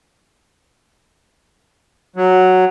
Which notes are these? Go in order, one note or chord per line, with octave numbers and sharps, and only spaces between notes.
F#3